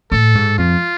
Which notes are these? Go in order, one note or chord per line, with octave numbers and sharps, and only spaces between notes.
A2 A4
G#2
F2 F4